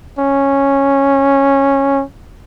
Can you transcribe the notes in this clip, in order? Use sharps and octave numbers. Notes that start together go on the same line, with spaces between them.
C#4